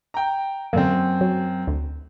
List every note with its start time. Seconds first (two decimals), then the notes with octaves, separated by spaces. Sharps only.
0.14 G5 A#5
0.73 F#2 D3 A#3 C4
1.21 F#3
1.67 D2